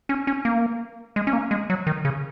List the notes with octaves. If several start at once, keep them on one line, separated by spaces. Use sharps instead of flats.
C#4
C#4
A#3
G#3
C#4
A#3
G#3
F#3
D#3
C#3